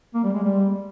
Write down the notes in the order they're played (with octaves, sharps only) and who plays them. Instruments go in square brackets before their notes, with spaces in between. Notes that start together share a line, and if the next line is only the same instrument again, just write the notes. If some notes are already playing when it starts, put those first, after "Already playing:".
[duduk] A#3
G3
G#3
G3